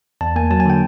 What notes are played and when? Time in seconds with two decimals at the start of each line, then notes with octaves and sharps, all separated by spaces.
0.21 E2 A5
0.36 A#3 G#5
0.51 F#3 A5
0.60 G#5
0.66 D3 G5